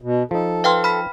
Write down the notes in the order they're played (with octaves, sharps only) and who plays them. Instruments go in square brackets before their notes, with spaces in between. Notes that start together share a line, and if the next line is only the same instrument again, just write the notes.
[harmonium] B2
[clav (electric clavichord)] F3 D#4 [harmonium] A4
[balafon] B4 C6 [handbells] F5 G5 F6
[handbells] B5 F6 B6